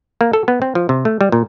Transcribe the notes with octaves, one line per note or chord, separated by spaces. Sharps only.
A#3
A4
B3
C4
F3
C3
A3
G3
A#2